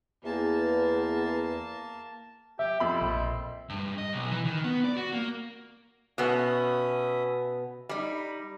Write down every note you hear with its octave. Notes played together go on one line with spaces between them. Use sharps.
E2 A#3 A5
G4 E5
F2 C4 B5
A#1
G2
D#5
B1
E3
D#3
B3
D5
F#4
A#3
B2 B3 C#4 E5 D#6
G3 D#4 B5